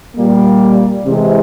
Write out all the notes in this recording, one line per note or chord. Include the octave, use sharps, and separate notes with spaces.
A#2 G3 A#3
C3 E3 G#3